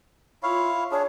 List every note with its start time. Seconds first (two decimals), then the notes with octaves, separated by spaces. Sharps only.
0.43 E4 F4 C#5 F5
0.92 D4 G#4 C#5